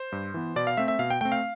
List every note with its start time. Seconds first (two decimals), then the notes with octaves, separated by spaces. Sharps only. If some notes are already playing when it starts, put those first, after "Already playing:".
Already playing: C5
0.12 G2
0.34 E3 B3
0.56 B2 D5
0.67 F5
0.77 A3 C4 E5
0.88 E5
0.99 B2 F5
1.10 G5
1.21 A3 C4 G5
1.32 F5